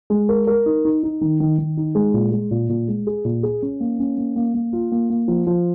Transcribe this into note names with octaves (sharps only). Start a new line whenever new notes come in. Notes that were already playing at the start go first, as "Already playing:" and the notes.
G#3
A#4
A#4
D#4
D#4
D#4
D#3
D#3
D#3
D#4
G#3
A#2
G#3
A#2
A#2
G#3
G#4
A#2
G#4
C#4
A#3
C#4
A#3
A#3
A#3
F4
A#3
A#3
F3
F3